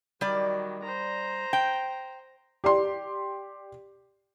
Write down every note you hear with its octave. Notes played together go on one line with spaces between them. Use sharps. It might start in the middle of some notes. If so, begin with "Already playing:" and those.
D#3 F#3 G3 D5
C5 A#5
G5
G4 D5 C6